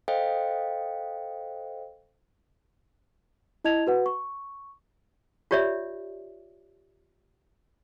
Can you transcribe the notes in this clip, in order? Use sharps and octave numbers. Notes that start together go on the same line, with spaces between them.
A4 C5 D#5 F5 G5
E4 D#5 A5 G#6 F7
F#4 B4 F#5
C#6
F4 G4 C#5 D5 E5